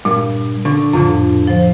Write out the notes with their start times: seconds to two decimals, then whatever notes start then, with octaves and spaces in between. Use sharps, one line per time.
0.05 G2 A#2
0.65 D3 C#6
0.93 F2 A2 D3 F3
1.47 F3 C5